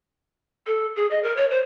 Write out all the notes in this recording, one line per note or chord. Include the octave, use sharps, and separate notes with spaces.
A4
G#4
D#5
A#4
C#5
C5